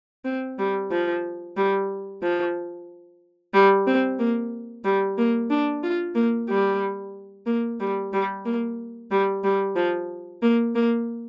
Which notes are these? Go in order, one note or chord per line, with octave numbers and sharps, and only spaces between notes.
C4
G3
F3
G3
F3
G3
C4
A#3
G3
A#3
D4
F4
A#3
G3
A#3
G3
G3
A#3
G3
G3
F3
A#3
A#3